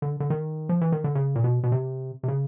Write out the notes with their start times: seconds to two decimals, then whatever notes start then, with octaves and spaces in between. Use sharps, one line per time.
0.02 D3
0.20 D3
0.30 D#3
0.69 F3
0.81 E3
0.92 D#3
1.04 D3
1.15 C#3
1.35 A#2
1.44 B2
1.63 B2
1.72 C3
2.23 C3
2.28 C#3